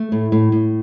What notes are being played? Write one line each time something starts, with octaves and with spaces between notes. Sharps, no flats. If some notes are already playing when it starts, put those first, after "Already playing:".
Already playing: A3
A2
A2
A2